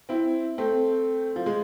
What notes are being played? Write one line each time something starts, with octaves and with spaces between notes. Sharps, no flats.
C4 E4
A3 C4
F3
G#3